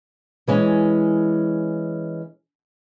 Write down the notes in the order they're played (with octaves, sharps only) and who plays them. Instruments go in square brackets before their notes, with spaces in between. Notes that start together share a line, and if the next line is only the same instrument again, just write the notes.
[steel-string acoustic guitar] E3 G#3 C#4